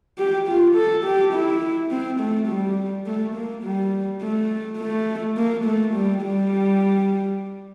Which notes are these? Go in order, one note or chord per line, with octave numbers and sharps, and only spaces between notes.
G4
F4
A4
G4
E4
C4
A3
G3
A3
A#3
G3
A3
A3
A#3
A3
G3
G3